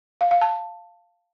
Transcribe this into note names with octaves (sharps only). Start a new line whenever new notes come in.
F5
F5
A5